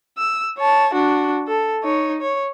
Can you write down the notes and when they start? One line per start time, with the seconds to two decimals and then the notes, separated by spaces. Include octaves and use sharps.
0.18 E6
0.58 C#5 A5
0.94 D4 F#4
1.47 A4
1.84 D#4 C#5
2.21 C#5